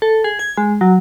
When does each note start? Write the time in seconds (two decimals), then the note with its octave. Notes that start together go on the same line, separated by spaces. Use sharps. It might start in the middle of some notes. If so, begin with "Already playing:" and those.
0.02 A4
0.24 G#4
0.39 G#6
0.57 G#3
0.81 F#3